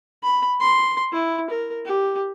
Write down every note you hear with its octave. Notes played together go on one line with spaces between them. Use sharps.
B5
C6
E4
A#4
G4